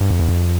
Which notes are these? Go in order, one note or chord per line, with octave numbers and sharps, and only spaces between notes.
G2
F2
E2
F2